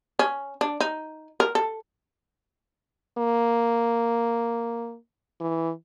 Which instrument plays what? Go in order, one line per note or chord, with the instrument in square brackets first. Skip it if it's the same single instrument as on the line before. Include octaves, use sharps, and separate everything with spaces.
[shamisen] C#4
D4
D#4
A#4
A4
[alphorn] A#3
E3